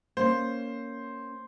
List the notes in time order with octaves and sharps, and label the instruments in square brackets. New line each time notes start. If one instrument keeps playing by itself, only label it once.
[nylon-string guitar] A#3 C#4 [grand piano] C5